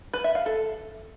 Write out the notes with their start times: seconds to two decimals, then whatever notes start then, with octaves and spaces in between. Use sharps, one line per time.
0.14 B4
0.24 E5
0.35 F5
0.46 A4